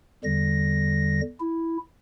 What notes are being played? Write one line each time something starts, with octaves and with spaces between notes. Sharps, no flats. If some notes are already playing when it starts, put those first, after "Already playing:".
E2 D3 G3 A#6
E4